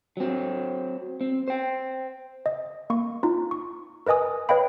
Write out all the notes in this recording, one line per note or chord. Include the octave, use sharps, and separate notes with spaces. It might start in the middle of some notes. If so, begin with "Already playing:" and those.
F#3 C4
C4
C5 G5
D#5
A#3 C#6
D#4 F4
C#6
A#4 B4 D#5 G#5 D#6
B4 C#5 D#5 F5 G5 B5